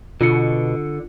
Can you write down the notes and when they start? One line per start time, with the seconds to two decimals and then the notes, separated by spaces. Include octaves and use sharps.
0.21 B2 D3 F4 C#7